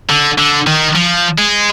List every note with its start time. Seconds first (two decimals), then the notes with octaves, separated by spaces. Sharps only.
0.10 D3
0.38 D3
0.67 D#3
0.95 F3
1.38 G#3